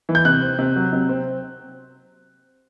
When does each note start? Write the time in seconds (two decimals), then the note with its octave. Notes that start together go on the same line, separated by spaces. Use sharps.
0.09 E3
0.15 G6
0.25 C3 F#6
0.42 C4
0.59 C3
0.76 F#3
0.93 C3
1.09 C4